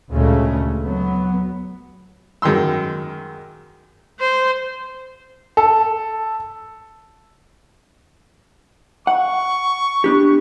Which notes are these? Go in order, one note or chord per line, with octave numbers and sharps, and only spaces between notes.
D2 A#2 C#3 G#3 A3
F#3 B3
F#2 D#3 G#3 C6 E6
C5
A4
F#5 C#6
B3 D4 G4